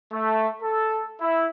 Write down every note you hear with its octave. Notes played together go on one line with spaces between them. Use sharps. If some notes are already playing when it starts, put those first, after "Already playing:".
A3
A4
E4